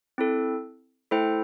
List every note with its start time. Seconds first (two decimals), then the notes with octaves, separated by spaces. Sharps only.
0.18 C4 E4 A4
1.11 A3 E4 A4 C5 G5